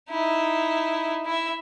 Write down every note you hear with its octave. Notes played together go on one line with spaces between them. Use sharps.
D#4 E4
E4 E5